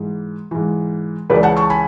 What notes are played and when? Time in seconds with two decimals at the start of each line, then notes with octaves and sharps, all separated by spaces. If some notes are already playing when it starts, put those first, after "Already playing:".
Already playing: G#2 E3
0.51 G#2 E3
1.30 C#2 C#3 E3 B4 D5
1.43 F#5 A5
1.57 A5 C#6
1.70 G#5 B5